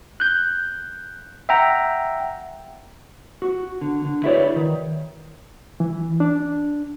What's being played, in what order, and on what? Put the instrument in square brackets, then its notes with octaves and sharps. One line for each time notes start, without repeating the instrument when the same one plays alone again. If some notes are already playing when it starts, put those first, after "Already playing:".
[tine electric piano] F#6 G6
E5 F#5 G5 A#5
[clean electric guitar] F#4
D3
D3
E4 F#4 G#4 B4 C#5 D5
D#3
[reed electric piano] E3
D4